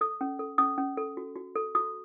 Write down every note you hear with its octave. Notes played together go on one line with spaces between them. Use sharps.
A4 D#6
C#4
A4
C#4 D#6
C#4
A4
F#4
F#4
A4
F#4 D#6